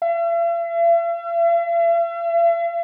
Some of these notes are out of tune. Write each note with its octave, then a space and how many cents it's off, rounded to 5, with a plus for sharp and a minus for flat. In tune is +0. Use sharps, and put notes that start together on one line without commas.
E5 +45